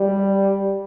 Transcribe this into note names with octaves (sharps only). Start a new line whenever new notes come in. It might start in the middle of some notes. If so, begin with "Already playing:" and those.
Already playing: G3